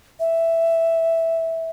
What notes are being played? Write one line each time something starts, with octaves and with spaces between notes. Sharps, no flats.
E5